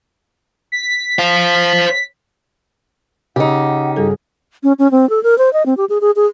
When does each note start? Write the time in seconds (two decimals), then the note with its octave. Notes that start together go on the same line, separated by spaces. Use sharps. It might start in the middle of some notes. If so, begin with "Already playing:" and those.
0.72 B6
1.19 C5 F5
3.36 C#3 D#4 G4 F#5
3.96 G2 G3 G#4 A4
4.63 C#4
4.79 C#4
4.91 C4
5.10 A4
5.23 A#4
5.38 C5
5.53 D#5
5.66 C4
5.77 G4
5.90 G#4
6.01 G#4
6.16 G#4